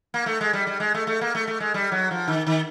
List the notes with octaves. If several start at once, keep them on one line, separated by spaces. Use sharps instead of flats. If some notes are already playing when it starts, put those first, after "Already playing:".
A#3
A3
G#3
G3
G3
G#3
A3
A3
A#3
A3
A3
G#3
G3
F#3
F3
D#3
D#3